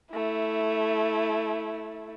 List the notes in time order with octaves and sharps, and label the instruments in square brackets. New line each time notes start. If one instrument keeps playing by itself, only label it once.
[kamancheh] A3 E4